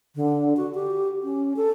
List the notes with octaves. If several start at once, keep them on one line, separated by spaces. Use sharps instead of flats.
D3
F#4
G4
C#4
A4